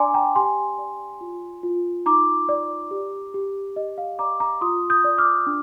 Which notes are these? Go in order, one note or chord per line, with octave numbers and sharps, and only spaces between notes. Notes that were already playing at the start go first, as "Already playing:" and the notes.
Already playing: D4 D5 G#5 A#5 C6 D6
G5 A#5
G4 G#5 C6
D5
F4
F4
D#4 A#5 D6
D5
G4
G4
G4 D#5
F5
D5 A#5 D6
A#5 D6
F4 C6 D#6
D#6 G6
D5
D6 F6
D4